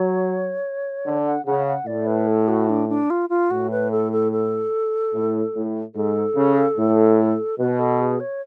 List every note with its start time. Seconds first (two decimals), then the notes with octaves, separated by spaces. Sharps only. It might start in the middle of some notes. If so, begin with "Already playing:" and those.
Already playing: F#3 C#5
1.06 D3
1.27 F#5
1.46 C#3 F#5
1.67 F#5
1.87 A2 D5
2.07 B4
2.27 A4
2.48 F#4
2.69 D4
2.89 D4
3.10 F4
3.30 F4
3.51 A2 F#4
3.71 B4
3.91 A4
4.12 A4
4.32 A4
5.14 A2
5.55 A2
5.95 G#2 A4
6.36 C#3
6.77 A2
7.59 B2 B4
7.79 A4
8.00 G#4
8.20 C#5